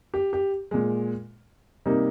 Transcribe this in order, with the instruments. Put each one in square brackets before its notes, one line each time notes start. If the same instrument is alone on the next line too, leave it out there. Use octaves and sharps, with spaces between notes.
[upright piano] G4
G4
A#2 G#3
C3 G3 A#3 D#4